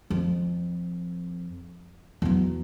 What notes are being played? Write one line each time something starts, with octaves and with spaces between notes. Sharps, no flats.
F2
E2 F#3